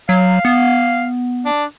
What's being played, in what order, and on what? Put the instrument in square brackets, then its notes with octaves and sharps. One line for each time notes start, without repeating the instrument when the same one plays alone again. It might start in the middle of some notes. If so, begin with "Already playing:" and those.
[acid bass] F#3 [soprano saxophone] F5
[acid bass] B3
[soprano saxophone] D4